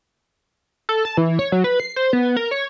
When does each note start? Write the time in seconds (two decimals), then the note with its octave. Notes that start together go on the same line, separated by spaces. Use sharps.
0.89 A4
1.05 A5
1.17 E3
1.39 C#5
1.52 F#3
1.64 B4
1.80 C7
1.96 C5
2.13 B3
2.37 A#4
2.51 C#5